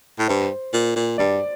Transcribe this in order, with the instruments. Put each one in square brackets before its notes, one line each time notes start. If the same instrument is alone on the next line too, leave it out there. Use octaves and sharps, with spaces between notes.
[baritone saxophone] A2
[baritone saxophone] G2 [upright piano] C5
[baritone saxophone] A#2
A#2
[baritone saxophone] G2 [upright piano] D5